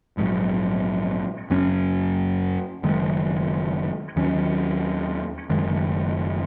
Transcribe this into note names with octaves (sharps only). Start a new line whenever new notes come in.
A#1 G#2 F#3
F#1 F#2 F#3 C#4
F#1 F#2 D#3 G#3
D#2 D#3 F#3 C#4
F#1 F#2 D#3 G#3